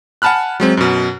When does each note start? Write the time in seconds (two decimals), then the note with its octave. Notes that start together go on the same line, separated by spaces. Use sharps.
0.22 F#5 G#5 A5 B5 F6 F#6
0.60 F#3 G#3 C4
0.77 F#2 B2